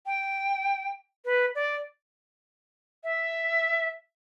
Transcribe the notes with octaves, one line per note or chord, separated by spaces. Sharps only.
G5
B4
D5
E5